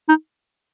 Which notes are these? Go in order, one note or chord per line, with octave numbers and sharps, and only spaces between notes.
D#4